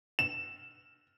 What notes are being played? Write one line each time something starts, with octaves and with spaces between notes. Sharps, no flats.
E7